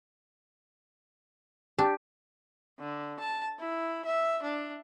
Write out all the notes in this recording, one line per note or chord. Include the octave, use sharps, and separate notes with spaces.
D4 G4
D3
A5
E4
E5
D4